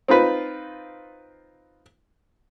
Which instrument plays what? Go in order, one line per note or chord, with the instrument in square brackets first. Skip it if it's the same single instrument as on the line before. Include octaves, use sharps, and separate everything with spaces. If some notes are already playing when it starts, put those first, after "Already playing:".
[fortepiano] C4 D#4 F4 B4